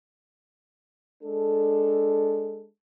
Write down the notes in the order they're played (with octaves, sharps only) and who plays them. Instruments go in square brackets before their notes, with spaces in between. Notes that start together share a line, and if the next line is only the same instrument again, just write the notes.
[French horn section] G#3 D4 A4